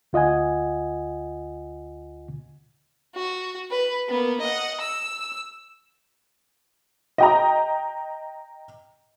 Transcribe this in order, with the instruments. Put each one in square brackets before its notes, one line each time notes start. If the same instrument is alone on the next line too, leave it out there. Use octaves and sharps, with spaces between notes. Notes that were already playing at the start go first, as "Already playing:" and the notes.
[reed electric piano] D2 F4 D#5 F#5 G#5
[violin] F#4
B4
A#3 B3
D#5 F#5
E6
[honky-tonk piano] D#5 G5 A#5